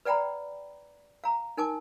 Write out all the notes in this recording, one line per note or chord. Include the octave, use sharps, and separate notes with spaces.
B4 D5 F#5 G5 A#5 B5
F5 A#5
D#4 A#4 G#5 A5 D6